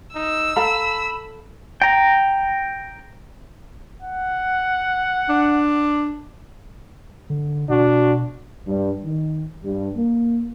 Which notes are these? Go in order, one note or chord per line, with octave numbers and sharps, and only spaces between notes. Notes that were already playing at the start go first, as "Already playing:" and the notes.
D#4 E6
A4 F5 A#5 B5
G5 A#5
F#5
D4
D3
B2 D4 F#4
G2
D#3
G2
A#3